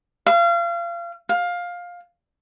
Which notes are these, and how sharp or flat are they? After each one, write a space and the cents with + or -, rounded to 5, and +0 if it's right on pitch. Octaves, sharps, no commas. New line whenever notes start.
F5 -30
F5 +15